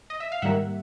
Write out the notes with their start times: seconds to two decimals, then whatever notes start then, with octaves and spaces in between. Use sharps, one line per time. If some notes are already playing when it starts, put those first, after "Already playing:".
0.10 D#5
0.20 E5
0.32 F5
0.42 G#2 D#3 G3 A#3 E5 F#5